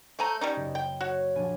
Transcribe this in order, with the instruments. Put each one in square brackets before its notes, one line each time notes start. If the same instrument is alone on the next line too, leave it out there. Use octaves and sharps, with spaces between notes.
[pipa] A3 G#5 A#5 [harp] C5 G6
[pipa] G3 C#4 D#4 [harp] D#5 D7
[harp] F#1
[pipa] G5
[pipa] F#4 [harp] C#5
[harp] A#1 D4 G#5